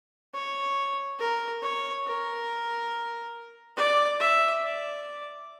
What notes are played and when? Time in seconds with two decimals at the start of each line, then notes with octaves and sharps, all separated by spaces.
0.34 C#5
1.20 A#4
1.62 C#5
2.06 A#4
3.77 D5
4.20 E5
4.63 D5